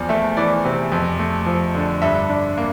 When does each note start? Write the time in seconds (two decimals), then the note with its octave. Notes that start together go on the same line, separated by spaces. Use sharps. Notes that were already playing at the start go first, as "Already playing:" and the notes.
Already playing: E2 F3 D5
0.09 A3 E5
0.37 E3 D5
0.65 C3
0.92 F2
1.19 A3
1.46 F3
1.75 D3
2.02 G2 E5
2.30 D4
2.58 A#3